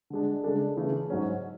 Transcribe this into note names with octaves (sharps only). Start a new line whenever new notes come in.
D3 G#3 D4
C#3 G#3 D4 A4
C#3 E3 A3
G#2 F#3 C#4